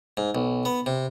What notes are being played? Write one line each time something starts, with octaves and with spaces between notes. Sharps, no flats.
G#2
B1
B3
C3